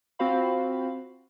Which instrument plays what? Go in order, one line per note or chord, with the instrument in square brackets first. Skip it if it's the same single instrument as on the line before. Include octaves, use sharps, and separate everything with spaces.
[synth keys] C4 F4 F#4 C5 F5 B5